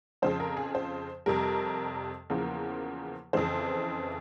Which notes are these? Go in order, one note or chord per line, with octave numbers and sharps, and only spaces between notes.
F2 C#3 F3 C5
A#4
G#4
C5
F2 C3 G3 A#4
E2 C#3 F3 A#3 A#4
F2 C#3 E3 C5